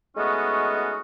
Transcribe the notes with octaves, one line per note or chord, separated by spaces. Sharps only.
G#3 A3 B3 C#4 D#4 F#4